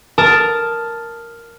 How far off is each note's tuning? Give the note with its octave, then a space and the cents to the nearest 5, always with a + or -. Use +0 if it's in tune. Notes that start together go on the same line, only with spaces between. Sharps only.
A#4 +0 A5 +0 D#6 +0